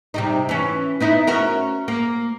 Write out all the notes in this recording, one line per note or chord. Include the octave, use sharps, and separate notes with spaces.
C3 G3 D#4
E3 C#4
B3 D#4 E4
C#4 F#4 A#4
A#3